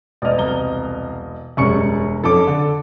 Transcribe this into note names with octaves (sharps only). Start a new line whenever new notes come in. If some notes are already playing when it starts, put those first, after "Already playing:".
E1 D5 D#5 F6
C2 A#5 G7
E1 F#2 G3 G#3 C#6 C#7
F2 C#4 A4 D6
D3